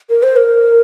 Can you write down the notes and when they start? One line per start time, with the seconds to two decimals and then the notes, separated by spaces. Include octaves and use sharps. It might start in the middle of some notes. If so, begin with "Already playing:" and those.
0.10 A#4
0.23 C5
0.36 A#4